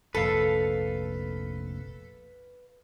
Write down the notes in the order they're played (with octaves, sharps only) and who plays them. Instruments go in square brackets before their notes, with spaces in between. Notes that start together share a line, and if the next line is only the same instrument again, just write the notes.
[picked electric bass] F1 A#1 [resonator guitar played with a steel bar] A4 [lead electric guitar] B4 F5